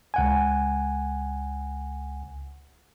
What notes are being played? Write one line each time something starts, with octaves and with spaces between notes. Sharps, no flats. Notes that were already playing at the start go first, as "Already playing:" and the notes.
C#2 F#5 G#5